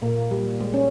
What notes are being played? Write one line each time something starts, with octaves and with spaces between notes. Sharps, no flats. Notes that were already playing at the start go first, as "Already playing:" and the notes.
A#2 A#3
G3
G#3
C#4